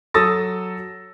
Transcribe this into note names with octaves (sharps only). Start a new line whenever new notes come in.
F#3 A4 D#6 E6 A6 A#6